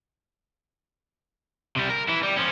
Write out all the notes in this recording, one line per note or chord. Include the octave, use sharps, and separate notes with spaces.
C3 G3
A#4
E3 E4
G3
F3 C#4